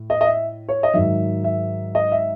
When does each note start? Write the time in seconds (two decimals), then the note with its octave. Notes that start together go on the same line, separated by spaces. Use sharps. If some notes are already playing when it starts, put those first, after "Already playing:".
Already playing: A2
0.10 D#5
0.21 D#5
0.26 E5
0.69 C#5
0.83 D#5
0.94 G#2 D#3 F#3 E5
1.44 E5
1.95 D#5
2.12 E5